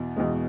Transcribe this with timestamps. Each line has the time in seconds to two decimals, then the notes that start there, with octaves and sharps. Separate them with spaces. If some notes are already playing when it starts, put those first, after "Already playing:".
Already playing: E2 B2
0.16 E2 B2 G#3